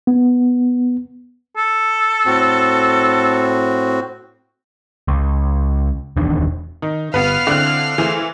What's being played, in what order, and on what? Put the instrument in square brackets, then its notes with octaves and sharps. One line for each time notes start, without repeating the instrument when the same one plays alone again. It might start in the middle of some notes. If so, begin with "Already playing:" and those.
[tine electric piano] B3
[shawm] A4
[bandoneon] A2 C4 F#4
[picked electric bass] C#2
D#1 E2 D#3 D4
[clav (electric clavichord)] D#3 [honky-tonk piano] D#4
[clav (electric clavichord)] G1 [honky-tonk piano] B3 B4 [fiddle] F5 F6
[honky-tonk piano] D3 F#6 [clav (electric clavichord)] C4 D4 E4
[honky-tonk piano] E3 [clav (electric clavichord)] A3 G#4 C5